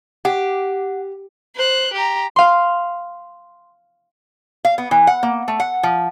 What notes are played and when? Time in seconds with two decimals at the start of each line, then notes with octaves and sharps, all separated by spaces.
0.25 G4 F#5
1.56 C5 F#6
1.93 G4 A#5
2.36 F5 C6
4.65 F5
4.78 B3
4.91 E3
5.07 F#5
5.23 A#3
5.48 A3
5.60 F#5
5.83 F3